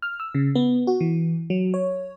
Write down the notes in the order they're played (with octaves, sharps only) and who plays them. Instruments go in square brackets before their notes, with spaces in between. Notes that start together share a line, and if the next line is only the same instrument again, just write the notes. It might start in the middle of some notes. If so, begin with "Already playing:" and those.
[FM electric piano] F6
E6
C#3
B3
F#4
E3
F#3
C#5